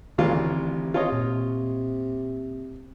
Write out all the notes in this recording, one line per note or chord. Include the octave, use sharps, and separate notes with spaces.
A1 D2 C3 D#3 E3 F4
F4 C#5 D#5
A#2